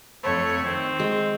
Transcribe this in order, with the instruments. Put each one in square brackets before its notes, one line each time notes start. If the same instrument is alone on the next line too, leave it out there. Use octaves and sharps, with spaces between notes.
[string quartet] F2 C#5 [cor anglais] A3
[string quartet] D#3 [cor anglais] C4
[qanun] G#3